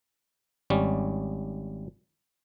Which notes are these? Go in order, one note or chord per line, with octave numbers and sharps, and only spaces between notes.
G#1 G3 C#4